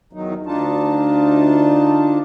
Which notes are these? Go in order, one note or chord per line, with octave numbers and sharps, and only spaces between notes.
E2 D#3 F#3 D#4
D2 D4 D#4 F4 A5